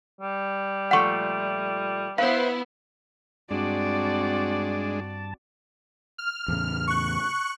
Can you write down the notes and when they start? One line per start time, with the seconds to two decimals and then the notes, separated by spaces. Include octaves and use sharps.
0.21 G3
0.91 A#2 F3 A3 F#5 C#6
2.18 B3 E4 B4 C5 F5
3.51 G2 G#3 C4 D4 F#4 D5 A5
6.18 F6
6.48 E2 A2 C#3
6.87 C#6 F#6